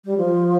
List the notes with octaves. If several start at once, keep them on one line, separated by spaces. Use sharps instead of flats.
G3
F3